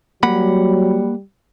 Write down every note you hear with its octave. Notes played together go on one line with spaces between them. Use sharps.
F#3 G3 A#3 F#5 B5